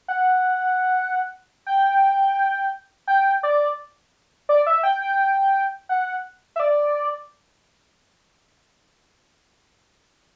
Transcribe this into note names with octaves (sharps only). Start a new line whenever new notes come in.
F#5
G5
G5
D5
D5
E5
G5
G5
F#5
E5
D5